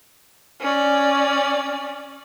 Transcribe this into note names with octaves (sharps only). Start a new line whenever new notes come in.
C#4 D5